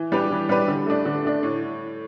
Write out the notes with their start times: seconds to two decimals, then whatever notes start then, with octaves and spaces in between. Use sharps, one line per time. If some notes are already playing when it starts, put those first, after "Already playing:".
Already playing: E3
0.12 G3 D4 G4 B4
0.31 E3
0.49 G3 D4 G4 B4
0.68 D3
0.87 A3 D4
1.05 D3
1.25 A3 D4
1.43 A2